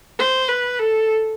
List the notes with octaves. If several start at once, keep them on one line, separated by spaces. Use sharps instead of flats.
C5
B4
A4